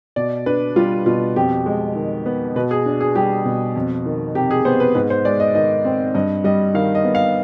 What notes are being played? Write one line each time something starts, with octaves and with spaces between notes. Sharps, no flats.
B2 D5
D4 B4
G3 F4
B2 F4
F2 G4
G#3
D#3
B3
B2 B4
G#4
D4
G#4
G3 G4
B2
F2
D#3
C3 G4
G#4
B3 C5
B4
G#2 B4
C5
G#3 D5
D#5
D#3 D#5
C4
G2 D#5
G3 D#5
D#3 F5
D#5
B3
F5